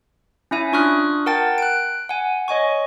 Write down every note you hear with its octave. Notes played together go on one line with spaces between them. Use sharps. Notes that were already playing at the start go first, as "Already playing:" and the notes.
C#4 E4 E5 G#5
D4 F4 C#6 D#6 F6 F#6
A#4 F#5 G5 A5 A6
F#6 D7
F#5 G#5
C#5 D#5 G#5 C#6